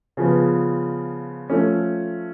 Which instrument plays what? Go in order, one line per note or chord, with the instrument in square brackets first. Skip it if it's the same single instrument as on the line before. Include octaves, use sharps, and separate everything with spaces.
[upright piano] C#3 F3 B3
F3 A3 C#4